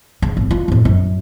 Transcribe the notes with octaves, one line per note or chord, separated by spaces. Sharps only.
C#3
G#1
F4
F2 A2
F#2